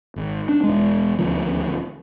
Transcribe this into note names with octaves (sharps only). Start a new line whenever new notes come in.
G#1
D4
E1 G#3
D#1 D2 F3